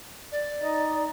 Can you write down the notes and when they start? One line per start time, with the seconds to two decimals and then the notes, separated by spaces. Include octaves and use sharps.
0.31 D5
0.62 D#4 D#5